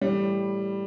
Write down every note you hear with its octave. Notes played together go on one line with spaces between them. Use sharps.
A2 E3 G3